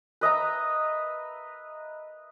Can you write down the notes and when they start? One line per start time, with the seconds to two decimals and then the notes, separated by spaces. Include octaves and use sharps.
0.21 B4 D#5 E5 A#5